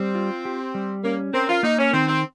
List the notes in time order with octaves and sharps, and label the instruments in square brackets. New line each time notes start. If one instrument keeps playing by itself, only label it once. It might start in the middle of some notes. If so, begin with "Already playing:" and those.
Already playing: [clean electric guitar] G3 [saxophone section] C4
[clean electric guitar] F4
G4
G3
[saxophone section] A#3 [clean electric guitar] C#4
[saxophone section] C4 [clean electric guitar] A#4
[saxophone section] F4
[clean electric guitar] A#3 [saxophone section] D#4
[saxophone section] C#4
[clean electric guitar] D#3 [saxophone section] C4
[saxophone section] C4